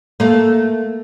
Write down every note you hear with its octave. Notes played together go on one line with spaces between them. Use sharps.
A3 A#3